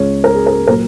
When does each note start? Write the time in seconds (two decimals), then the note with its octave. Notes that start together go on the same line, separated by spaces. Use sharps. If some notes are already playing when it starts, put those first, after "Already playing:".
Already playing: C#2 C#3 G#3 C#5
0.24 A#4
0.35 G#4
0.47 A#4
0.67 A#2 F#3 A#4